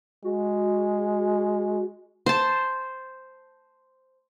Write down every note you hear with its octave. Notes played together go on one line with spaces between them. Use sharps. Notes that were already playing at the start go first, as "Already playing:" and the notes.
G#3 F#4
C5 A5